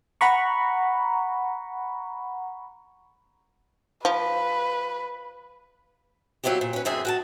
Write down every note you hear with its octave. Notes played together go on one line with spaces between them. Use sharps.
F#5 A#5 B5 C#6
F3 B4
F#3 C4 E4 F4 G4
A#2
C#4 B4
F#2 D3 C4 G#4 E5 G#5
F#4 G5 A5